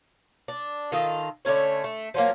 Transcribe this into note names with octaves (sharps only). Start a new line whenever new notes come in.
D4
D#3 F4 A4 D#5
D3 A3 C#4 C#5
A3
F3 F#3 A#3